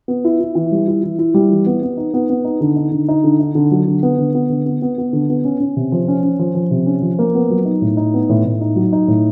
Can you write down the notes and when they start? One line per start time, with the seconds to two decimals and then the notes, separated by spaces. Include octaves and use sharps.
0.08 B3
0.25 E4
0.40 E4
0.55 E3
0.72 G3
0.87 E4
1.03 E3
1.19 E4
1.34 G3
1.51 E3
1.67 B3
1.82 B3
1.97 D#4
2.14 B3
2.30 B3
2.45 D#4
2.61 D3
2.76 D#4
2.92 D3
3.08 D#4
3.24 D3
3.40 D#4
3.55 D3
3.71 F#3
3.88 D3
4.03 B3
4.18 D3
4.35 B3
4.50 D3
4.66 B3
4.82 B3
4.98 B3
5.13 D3
5.30 B3
5.45 C#4
5.60 C#4
5.77 C3
5.92 F3
6.08 C#4
6.23 C#4
6.39 F3
6.55 F3
6.71 C3
6.86 C#4
7.02 F3
7.19 A#3
7.35 B3
7.50 F#3
7.65 D#4
7.82 A2
7.97 D#4
8.14 B3
8.29 A2
8.45 A2
8.61 D#4
8.76 F#3
8.93 D#4
9.08 A2